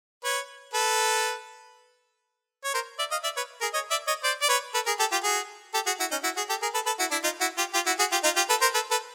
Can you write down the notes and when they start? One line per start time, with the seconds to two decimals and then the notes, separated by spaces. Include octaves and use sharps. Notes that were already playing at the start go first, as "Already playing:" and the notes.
0.24 B4 C#5
0.74 A4 B4
2.64 C#5
2.74 A#4 C5
2.99 D5 E5
3.11 D#5 F5
3.24 D5 E5
3.36 B4 C#5
3.61 G#4 A#4
3.74 C#5 D#5
3.91 D5 E5
4.07 C#5 D#5
4.24 C5 D5
4.42 D5
4.49 B4 C#5
4.74 A4 B4
4.86 G#4 A#4
4.99 G4 A4
5.12 F4 G4
5.24 F#4 G#4
5.74 G4 A4
5.86 F#4 G#4
6.00 E4 F#4
6.11 C#4 D#4
6.24 E4 F#4
6.36 F#4 G#4
6.49 G4 A4
6.62 G#4 A#4
6.74 A4 B4
6.86 A4 B4
6.99 E4 F#4
7.11 D4 E4
7.24 D#4 F4
7.41 E4 F#4
7.58 F4 G4
7.74 F4 G4
7.86 E4 F#4
7.99 F#4 G#4
8.12 F4 G4
8.24 D#4 F4
8.36 F4 G4
8.50 A4 B4
8.62 A#4 C5
8.74 A4 B4
8.91 A4 B4